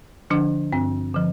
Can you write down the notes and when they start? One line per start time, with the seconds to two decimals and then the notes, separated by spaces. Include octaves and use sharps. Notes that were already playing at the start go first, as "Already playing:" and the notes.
0.30 D3 F3 D4
0.73 G2 C4
1.14 D3 F3